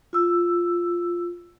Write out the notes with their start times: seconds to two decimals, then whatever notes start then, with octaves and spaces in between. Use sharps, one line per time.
0.13 F4 E6